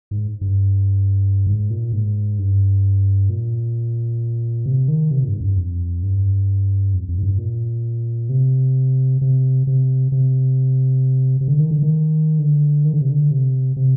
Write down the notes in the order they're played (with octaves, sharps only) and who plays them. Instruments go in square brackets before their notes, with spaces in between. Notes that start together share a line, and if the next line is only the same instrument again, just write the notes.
[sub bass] G#2
G2
G#2
A#2
G#2
G2
A#2
C3
D#3
C3
A#2
G2
G#2
F2
G2
F2
G2
F2
F2
G#2
G2
A#2
C3
C3
C3
C3
C3
D3
D#3
D3
D#3
D3
D#3
D3
C3
D3
C3
C3